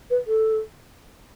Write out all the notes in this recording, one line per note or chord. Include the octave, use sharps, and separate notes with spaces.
B4
A4